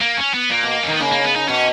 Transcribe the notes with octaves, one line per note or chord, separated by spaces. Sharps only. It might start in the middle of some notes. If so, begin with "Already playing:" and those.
A#3
C#4
B3
A#2 A#3
B2
C#4
D#3 B3
C#3 A#3
A#3
B3
D#4
B2 C#4